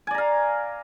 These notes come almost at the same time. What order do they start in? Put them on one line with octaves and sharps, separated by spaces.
G#5 D5 A#5 F5